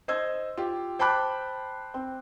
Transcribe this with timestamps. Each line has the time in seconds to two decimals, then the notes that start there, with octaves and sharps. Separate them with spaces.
0.08 C5 D#5 E6 G#6
0.57 F4 G4
0.99 C5 G5 A5 B5 D6 F#6
1.94 C4